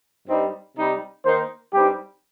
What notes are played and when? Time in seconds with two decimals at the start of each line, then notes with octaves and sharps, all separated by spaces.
0.29 G2 G3 C4 D#4
0.78 C3 G3 D#4
1.26 D#3 A#3 D#4 C5
1.74 G2 G3 C4 D#4 G4